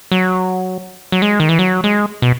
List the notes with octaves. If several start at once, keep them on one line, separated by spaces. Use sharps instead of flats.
F#3
F#3
G#3
D#3
E3
F#3
G#3
B2